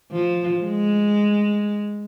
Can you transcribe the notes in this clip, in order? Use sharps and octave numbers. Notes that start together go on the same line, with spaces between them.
F3
G#3